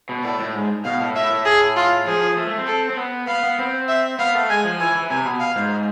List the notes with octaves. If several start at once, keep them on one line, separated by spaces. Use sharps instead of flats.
B2
A2 D5
A2
G#2
B2 F5
A2
A2 E5
A2
G#4
F4
F3 G#4
A3
A3
C4
A4
C4
B3
B3 F5
B3
C4
E5
B3 F5
A3
G#3 G#5
F3
E3 G#5
E3
C3 G#5
B2
F5
G#2